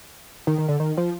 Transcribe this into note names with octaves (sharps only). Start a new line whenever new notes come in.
D#3
D#3
D3
D#3
F3